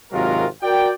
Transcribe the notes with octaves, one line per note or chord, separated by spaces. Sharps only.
G#1 C3 F#3 G#3 F4 A#4
F#4 A#4 D5 G5